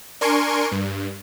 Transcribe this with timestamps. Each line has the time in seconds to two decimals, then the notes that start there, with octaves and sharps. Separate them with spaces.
0.21 D4 A#4 G#5 C6 C#6 D7
0.72 G2